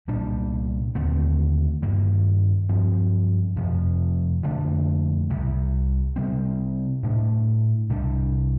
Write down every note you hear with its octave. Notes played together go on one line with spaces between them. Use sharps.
C2 A#2 G3 D4
D#2 D3 A3 C4
G2 D#3 A#3
G2 F3 C4
F2 C3 F3
F2 D3 A3 D4
C2 C3 G3
C3 G3 C4
A2 A3 D4
C2 C3 G3 D4